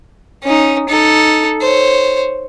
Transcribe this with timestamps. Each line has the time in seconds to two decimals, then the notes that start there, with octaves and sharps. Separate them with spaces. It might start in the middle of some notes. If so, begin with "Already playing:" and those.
0.43 C#4 D#4
0.88 D#4 A4
1.61 C5 C#5